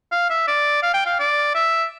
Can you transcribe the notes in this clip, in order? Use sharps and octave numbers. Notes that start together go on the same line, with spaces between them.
F5
E5
D5
F5
G5
F5
D5
E5